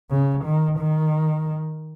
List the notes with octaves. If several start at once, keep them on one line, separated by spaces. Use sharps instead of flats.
C#3
D#3
D#3